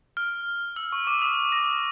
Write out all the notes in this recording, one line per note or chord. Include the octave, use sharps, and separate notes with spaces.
F6
E6
C#6
D6
D#6
A#6